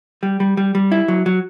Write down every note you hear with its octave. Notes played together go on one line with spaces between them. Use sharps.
G3
G3
G3
G3
E4
F#3
F#3